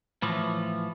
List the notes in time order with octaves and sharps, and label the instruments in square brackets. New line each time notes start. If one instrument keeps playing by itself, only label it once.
[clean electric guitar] A2 E3 F3